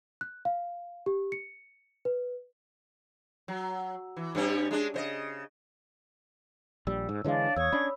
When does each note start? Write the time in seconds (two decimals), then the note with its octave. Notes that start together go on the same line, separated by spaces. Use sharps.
0.21 F#6
0.45 F5
1.06 G4
1.32 C#7
2.05 B4
3.48 F#3
4.16 E3
4.35 G2 G3 C#4
4.71 G#3 D4
4.94 C#3 C5 D#5
6.87 A#1 G3 E6
7.09 G#2
7.24 D3 E3 G#3 D4 C#5 F5
7.56 E2 C#5 C#6 D#6 E6 G#6
7.73 C#4 D4 B5